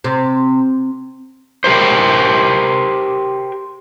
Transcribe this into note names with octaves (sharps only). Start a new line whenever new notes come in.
C3
G4 A#4 C5